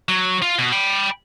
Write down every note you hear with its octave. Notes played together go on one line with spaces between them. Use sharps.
F#3
F4
B2
G5 B5